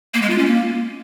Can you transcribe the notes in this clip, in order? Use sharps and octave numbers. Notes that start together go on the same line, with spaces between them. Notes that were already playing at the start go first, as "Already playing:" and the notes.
A#3
G#3
F4
C#4
A#3